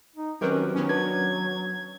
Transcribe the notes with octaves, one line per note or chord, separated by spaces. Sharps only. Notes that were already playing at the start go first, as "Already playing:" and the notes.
D#4
D#3 F#3 C4 C#4 G4 A#4 B4
D#3 F#3 B3 C#4
D4 F#4 B4 G#6